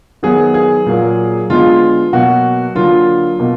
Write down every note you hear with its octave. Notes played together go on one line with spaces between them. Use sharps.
D#3 F#3 B3 G#4
G#4
A#2 F#3 A#3
D3 G#3 B3 F4
B2 F#3 A#3 F#4
D3 F#3 A#3 F4
B2 A#3